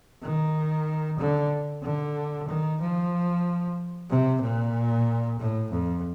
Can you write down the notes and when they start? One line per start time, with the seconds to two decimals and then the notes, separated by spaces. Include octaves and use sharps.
0.22 D#3
1.19 D3
1.83 D3
2.48 D#3
2.81 F3
4.10 C3
4.41 A#2
5.39 A2
5.71 F2